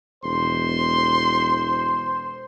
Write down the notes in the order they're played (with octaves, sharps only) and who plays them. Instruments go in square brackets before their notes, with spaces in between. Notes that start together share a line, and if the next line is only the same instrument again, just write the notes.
[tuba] E1 [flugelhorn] C5 [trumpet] C6